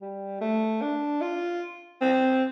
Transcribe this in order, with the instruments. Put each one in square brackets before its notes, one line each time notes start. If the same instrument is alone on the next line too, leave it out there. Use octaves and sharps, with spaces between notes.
[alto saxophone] G3
A3
D4
F4
C4